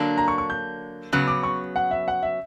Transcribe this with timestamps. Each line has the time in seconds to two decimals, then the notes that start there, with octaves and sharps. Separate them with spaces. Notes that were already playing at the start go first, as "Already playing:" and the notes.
Already playing: D3 F#3 A#3 D4
0.18 A#5
0.28 C#6
0.38 C#6
0.50 G6
1.12 C#3 F#3 B3 F#6
1.28 D6
1.43 C#6
1.76 F#5
1.91 E5
2.08 F#5
2.23 E5